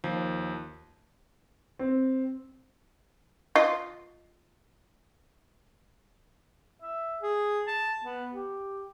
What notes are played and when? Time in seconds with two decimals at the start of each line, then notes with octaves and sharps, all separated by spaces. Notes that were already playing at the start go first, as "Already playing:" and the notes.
0.04 D#2 F3
1.79 C4
3.56 F4 D#5
6.80 E5
7.21 G#4
7.67 A5
8.04 B3
8.33 G4